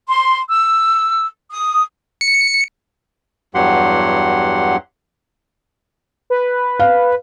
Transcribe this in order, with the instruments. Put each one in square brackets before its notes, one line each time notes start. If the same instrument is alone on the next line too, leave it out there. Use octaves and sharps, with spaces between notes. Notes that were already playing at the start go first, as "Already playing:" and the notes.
[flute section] C6
E6
D#6
[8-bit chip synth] C#7
[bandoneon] E2 G2 F#3 G4 F#5 C6
[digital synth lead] B4
[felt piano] F5